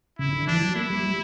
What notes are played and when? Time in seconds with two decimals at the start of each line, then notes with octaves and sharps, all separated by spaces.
0.19 C#3 E4
0.33 D3
0.47 E3 D4
0.62 F#3
0.75 A#3 E4
0.90 G3
1.03 G3